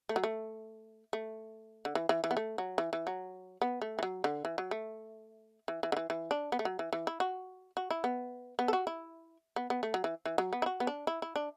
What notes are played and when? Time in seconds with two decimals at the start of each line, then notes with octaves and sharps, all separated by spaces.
0.09 A3
0.16 F#3
0.24 A3
1.13 A3
1.85 D3
1.95 E3
2.09 E3
2.24 E3
2.31 B3
2.37 A3
2.58 F#3
2.78 E3
2.93 E3
3.07 F#3
3.62 B3
3.82 A3
3.99 E3
4.03 F#3
4.24 D3
4.45 E3
4.58 F#3
4.71 A3
5.68 E3
5.83 E3
5.92 D3
5.97 E3
6.10 E3
6.31 D4
6.52 B3
6.59 A3
6.65 F#3
6.79 E3
6.93 E3
7.07 E4
7.20 F#4
7.77 F#4
7.91 E4
8.04 B3
8.59 B3
8.68 A4
8.73 F#4
8.87 E4
9.56 B3
9.70 B3
9.83 A3
9.94 F#3
10.04 E3
10.26 E3
10.38 F#3
10.53 B3
10.62 E4
10.66 F#4
10.80 B3
10.87 D4
11.07 E4
11.22 E4
11.36 D4